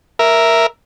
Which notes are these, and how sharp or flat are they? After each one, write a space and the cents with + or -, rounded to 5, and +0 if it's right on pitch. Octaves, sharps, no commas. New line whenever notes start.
A#4 +0 E5 +0